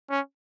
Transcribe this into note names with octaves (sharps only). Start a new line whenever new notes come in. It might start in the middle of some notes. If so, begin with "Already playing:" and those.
C#4